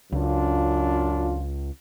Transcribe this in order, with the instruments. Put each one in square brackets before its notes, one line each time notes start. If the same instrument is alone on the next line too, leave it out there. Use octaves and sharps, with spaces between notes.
[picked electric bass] C#2 [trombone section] F#2 D4 F4